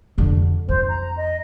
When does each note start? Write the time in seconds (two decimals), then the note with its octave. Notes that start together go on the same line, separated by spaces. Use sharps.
0.18 F2 D3
0.69 F2 C5
0.88 A#5
1.17 D#5